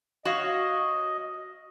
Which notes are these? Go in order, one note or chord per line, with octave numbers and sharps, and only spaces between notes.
F#4 C#5 D#5 F5